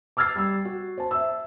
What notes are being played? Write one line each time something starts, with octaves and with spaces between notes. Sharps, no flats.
D6 E6 F6 G#6 A6 C7
G3 E6
F#4
C5 A5
E5 E6